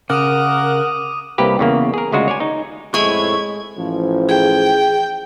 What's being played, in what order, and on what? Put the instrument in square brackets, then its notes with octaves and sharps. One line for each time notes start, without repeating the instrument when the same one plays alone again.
[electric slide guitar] C#3 [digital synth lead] A#4 [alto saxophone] F#5 [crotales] D6 D#6 D#7
[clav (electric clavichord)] C2 A#3 G4 B4
E2 C#3 A#3
G#4 A#4
D2 C#3 G#3 F4 F#4
C#5 D5 G#5
D#4
[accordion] F2 A2 E4 [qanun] G#3 G#5 B5 [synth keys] C#6 [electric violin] G#6
[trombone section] A1 F3
[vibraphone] G#4 [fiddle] G5